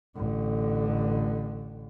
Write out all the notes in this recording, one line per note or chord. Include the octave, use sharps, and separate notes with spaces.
A1 D3